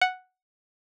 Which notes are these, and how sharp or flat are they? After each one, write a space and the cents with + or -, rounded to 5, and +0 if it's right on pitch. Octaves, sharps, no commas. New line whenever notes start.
F#5 +0